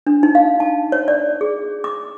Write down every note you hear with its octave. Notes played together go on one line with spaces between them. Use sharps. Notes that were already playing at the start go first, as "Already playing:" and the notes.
D4
D#4
F5
A5
C#5
D5
G#4
D6